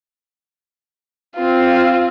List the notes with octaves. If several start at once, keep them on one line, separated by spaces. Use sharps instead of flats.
C4 F4